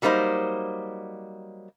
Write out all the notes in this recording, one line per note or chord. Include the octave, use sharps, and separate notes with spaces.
F#3 G3 A#3 D#4 C5